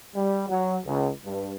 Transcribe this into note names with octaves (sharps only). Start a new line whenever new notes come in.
G3
F#3
C#2
G2